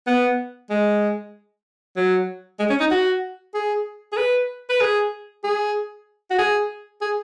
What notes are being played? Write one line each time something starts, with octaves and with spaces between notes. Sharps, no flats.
B3
G#3
F#3
G#3
C#4
D#4
F#4
G#4
G#4
B4
B4
G#4
G#4
F#4
G#4
G#4